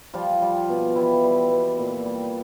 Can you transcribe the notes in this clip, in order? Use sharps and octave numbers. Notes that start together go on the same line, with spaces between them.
F3 G3 F4
G3
B2
E3 G3 E4
G3
B2
A#2
G3